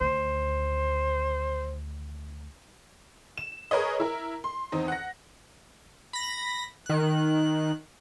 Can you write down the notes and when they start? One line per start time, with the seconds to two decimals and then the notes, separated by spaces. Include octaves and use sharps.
0.01 D2 D#3 C5
3.38 E7
3.71 G#4 A#4 B4 C#5 D#5
4.00 E4 A#4
4.44 C6
4.72 E2 C4 D#4
4.88 F#5 A#6
6.13 B5 A#6
6.86 D#3 F#6